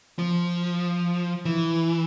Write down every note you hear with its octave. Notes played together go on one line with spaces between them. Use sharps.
F3
E3